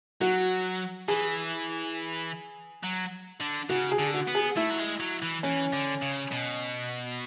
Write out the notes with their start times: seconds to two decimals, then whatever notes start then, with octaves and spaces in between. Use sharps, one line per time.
0.21 F#3 F#4
1.08 E3 G#4
2.83 F#3
3.40 D3
3.69 C#3 F#4
3.92 G#4
3.99 D3
4.14 F#4
4.28 B3
4.35 G#4
4.57 A3 E4
4.70 F#3
4.79 G#3
5.00 F#3
5.22 E3
5.43 E3 C#4
5.73 D3
6.02 C#3
6.31 B2